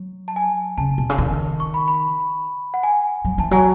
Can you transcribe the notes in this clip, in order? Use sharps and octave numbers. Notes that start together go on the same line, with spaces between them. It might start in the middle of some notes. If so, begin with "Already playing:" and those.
Already playing: F#3
A5
G#5
C#3 A5
B2
C#3
D#3
C#6
B5
B5
F#5
G#5
F#3
E3 A5
F#3 G#5